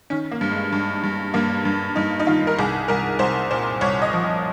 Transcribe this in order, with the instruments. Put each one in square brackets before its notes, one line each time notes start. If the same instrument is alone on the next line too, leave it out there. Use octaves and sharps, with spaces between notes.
[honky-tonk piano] D#3 C#4
A#3
G2
G#3
G2
G2
G2 A#3
G2
G2 D#4
D#4
D#3 F4
A#4
C2 G#4
C2 A#4
C2 C5
A#2 C5
C2 C#5
D#5
F3